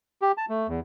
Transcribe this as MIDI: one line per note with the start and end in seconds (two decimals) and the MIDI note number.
0.22 0.32 67
0.37 0.45 81
0.49 0.67 57
0.68 0.80 40